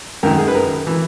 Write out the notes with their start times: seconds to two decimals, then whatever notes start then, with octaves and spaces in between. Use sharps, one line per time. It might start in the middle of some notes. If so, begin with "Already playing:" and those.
0.23 F#2 D#3 A#4
0.38 G#4
0.48 B4
0.55 A#4
0.87 E3